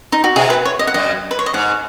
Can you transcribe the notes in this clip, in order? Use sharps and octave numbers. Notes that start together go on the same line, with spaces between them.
D#4
F#4
B2 G#4
B4
C#5
D#5
F#5
F#2 D#5
B4
C#5
D#5
G#2 F#5